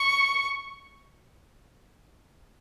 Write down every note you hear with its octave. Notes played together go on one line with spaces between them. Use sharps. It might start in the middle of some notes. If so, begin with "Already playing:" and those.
Already playing: C#6